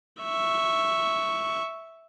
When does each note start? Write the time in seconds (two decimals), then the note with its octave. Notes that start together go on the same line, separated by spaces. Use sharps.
0.22 E5 C#6